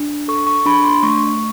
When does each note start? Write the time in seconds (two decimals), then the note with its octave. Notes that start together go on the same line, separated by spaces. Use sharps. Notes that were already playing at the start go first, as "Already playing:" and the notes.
Already playing: D4
0.28 A4 C#6
0.47 C#6
0.65 D4 B5
0.84 C6
1.03 A3 C#6